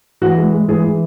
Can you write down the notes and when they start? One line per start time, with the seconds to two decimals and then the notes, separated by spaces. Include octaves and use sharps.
0.21 E3 F#4
0.37 G#3
0.53 G#3
0.68 E3 G#4
0.84 E3